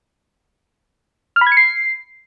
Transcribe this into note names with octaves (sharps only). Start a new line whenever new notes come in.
F6
B5
G#6
C#7
C7